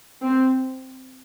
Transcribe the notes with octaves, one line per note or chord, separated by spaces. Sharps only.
C4